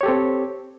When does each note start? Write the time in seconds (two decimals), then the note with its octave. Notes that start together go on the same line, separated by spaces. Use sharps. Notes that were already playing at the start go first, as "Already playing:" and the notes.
0.01 C#5
0.03 G4
0.06 A4
0.08 C4